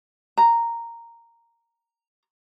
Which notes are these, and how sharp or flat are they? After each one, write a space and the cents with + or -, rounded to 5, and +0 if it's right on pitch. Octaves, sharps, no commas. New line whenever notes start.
A#5 -5